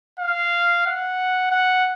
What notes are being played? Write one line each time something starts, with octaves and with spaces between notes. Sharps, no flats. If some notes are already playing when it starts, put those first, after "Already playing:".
F5
F#5
F#5